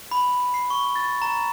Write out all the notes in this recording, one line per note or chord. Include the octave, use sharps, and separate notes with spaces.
B5
C7
C#6
A6
A#5